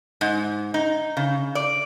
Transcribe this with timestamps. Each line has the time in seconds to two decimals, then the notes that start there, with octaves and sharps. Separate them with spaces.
0.21 G#2
0.74 D#4
1.17 C#3
1.55 D5